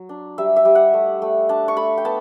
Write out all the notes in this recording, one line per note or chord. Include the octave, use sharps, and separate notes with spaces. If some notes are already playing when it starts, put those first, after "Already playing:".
Already playing: F#3
D4
G3 E5
E5
G3
F#5
A3
A3
D4 A5
C#6
A3 B5
G5
B3 A5